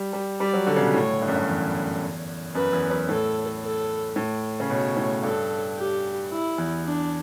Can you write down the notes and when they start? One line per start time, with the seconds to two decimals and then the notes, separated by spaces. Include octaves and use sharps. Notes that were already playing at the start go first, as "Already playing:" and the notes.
Already playing: G3
0.13 G3
0.39 G3 D5
0.53 F#3
0.67 D3
0.76 C#3
0.80 B2
0.94 A2 C#5
1.21 G2
1.28 F#2
1.35 G2
1.48 E2
2.55 F#2 B4
2.73 E2
2.90 F#2
3.09 A2 A4
3.62 A4
4.16 A2
4.60 C#3
4.70 B2 C#5
4.96 A2
5.23 G2 A4
5.77 G4
6.31 E4
6.58 E2
6.85 D4